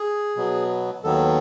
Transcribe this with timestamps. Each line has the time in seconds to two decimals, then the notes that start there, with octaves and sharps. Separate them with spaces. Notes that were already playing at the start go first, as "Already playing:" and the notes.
Already playing: G#4
0.36 B2 F#3 B3
1.04 D#2 D#3 F#3 B3 A4